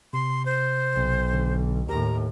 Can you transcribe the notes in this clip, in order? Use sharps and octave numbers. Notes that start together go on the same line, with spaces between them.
C3 C6
C5
B1
D3
D#2 A2 G4 A#4 A#5